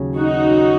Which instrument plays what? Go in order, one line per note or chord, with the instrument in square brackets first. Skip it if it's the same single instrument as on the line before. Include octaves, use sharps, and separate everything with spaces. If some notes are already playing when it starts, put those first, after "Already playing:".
Already playing: [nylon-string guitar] D#2 C#3 F#3
[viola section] D#4 F#4